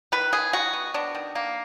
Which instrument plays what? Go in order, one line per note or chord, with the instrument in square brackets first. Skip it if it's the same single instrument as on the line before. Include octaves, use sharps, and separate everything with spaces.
[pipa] D#3 B4
D#3 G#4
D#3 F#4
B3
B3 D4
D#3
A#3